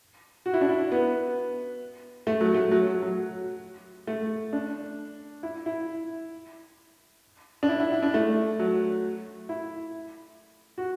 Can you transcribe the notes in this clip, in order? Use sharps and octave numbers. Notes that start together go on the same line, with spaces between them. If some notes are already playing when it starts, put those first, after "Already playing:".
F#4
E4
D4
E4
B3
A3
F#3
A3
F#3
F#3
F#3
A3
D4
E4
E4
D4
E4
E4
E4
D4
A3
F#3
E4
F#4